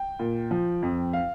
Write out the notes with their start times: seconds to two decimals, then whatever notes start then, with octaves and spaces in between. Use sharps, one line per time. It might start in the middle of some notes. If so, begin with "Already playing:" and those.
Already playing: G5
0.19 A#2
0.51 F3
0.82 F2
1.13 F5